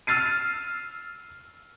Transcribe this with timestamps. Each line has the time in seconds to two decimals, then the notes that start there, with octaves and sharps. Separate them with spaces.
0.07 E6 F6 A6 C7 D#7